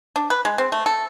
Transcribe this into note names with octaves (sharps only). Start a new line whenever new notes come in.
D4
B4
G#3
C4
A3
A4